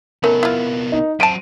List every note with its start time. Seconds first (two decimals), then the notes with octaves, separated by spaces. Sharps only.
0.24 C3 A3 B3 C#4 D#4 A#4
0.43 E4 F4
0.92 D#4
1.20 F#3 C5 E5 A5 D7 D#7